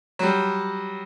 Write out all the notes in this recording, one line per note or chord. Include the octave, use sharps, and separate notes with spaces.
F#3 G3